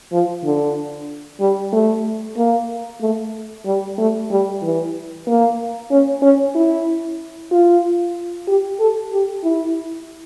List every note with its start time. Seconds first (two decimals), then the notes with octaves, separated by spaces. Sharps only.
0.12 F3
0.44 D3
1.40 G3
1.73 A3
2.37 A#3
3.01 A3
3.66 G3
3.98 A3
4.30 G3
4.62 E3
5.27 A#3
5.91 C#4
6.22 C#4
6.55 E4
7.51 F4
8.47 G4
8.80 A4
9.12 G4
9.43 E4